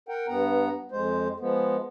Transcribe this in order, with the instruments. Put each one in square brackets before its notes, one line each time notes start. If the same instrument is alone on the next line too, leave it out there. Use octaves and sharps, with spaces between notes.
[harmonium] A#4 F#5 G5
G2 B3 F#5 A#5
F2 G#3 C5
F3 G#3 B3